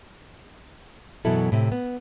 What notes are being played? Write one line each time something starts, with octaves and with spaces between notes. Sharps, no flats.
F#2 B2 E3 F#3 E4 A4
A2 C3 C4
B3